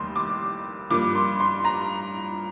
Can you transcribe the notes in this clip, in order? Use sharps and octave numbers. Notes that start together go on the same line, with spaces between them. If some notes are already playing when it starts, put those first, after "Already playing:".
Already playing: F1 D#2 D#3 G3 C6
D6
G2 F3 A#3 D6
C6
C6
A#5